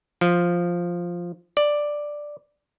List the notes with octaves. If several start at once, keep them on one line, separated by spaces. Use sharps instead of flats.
F3
D5